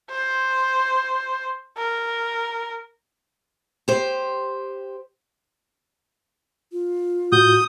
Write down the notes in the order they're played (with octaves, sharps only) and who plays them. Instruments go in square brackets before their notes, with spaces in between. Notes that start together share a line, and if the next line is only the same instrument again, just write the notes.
[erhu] C5
A#4
[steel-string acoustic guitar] G4 C5
[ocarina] F4
[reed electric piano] A2 F#4 [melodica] D#6 [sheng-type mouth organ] G6